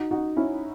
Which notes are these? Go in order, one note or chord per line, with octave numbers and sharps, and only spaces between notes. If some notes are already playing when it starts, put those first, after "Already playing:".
Already playing: D#4 F#4
D#4 F#4
C#4 E4